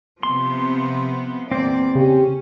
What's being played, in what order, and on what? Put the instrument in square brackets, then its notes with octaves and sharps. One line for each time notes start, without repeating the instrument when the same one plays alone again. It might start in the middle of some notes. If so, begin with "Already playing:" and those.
[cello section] C3 F3 B3 [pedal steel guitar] C6
[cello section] E2 A#2 D5 [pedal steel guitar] C4 C5
[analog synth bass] C#3 [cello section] C#4 [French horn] G4